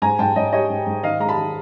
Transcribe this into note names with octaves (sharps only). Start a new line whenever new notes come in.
G#2 G#5 A#5
G#2 G5 A5
G#2 C#5 D#5
G3 C#5 D#5
G#2
G#2
D#3 D#5 F5
G#3 A#5
A5 B5
D#3